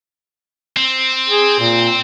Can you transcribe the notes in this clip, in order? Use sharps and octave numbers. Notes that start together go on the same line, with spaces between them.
C4
G#4
A#2